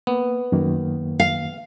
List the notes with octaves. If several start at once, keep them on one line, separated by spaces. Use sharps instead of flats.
A#3 B3
F#2 D#3 A#3
F5